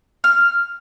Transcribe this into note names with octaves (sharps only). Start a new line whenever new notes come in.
F6